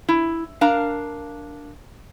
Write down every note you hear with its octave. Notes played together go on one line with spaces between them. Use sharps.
E4
D4 A#4 F5 A#5